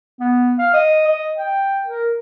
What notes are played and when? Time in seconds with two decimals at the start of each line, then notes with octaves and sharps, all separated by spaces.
0.20 B3
0.59 F5
0.74 D#5
1.08 D#5
1.37 G5
1.86 A#4